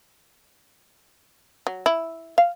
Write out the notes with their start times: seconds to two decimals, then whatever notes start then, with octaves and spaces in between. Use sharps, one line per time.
1.67 F#3
1.86 E4
2.38 F5